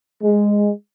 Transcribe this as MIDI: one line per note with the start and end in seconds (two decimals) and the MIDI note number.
0.24 0.71 56